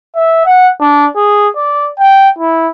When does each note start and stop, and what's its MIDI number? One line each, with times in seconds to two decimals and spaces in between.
0.16 0.43 76
0.46 0.68 78
0.81 1.06 62
1.16 1.48 68
1.56 1.88 74
1.99 2.29 79
2.38 2.69 64